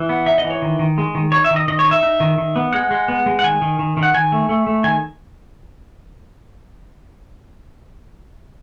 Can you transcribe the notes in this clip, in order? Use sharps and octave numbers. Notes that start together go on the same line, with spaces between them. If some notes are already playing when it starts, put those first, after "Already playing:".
Already playing: E3
B3
D#4 E5
D#5
E3
C#5
D#3
D#3
G#3
D#3
D#4 C#5
E5
D#3
D#5
D#3 D#5
C#5
D#4
E5
D#4
D#3
D#3
B3
G#3 F#5
G#3
B3
G#3
F#5
D#3 G#5
D#3
D#3
D#3
F#5
D#3 G#5
A3
A3
A3
D#3 G#5